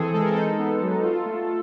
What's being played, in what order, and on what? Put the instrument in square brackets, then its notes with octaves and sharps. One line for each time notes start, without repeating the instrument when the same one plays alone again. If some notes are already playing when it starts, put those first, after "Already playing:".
Already playing: [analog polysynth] E3 C4 G#4 A4
G#3 A4
A#4
D#4 A4
B3
F#3
F4
A3